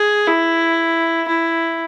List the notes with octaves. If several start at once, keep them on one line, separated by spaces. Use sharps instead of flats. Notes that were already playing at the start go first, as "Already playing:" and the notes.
Already playing: G#4
E4
E4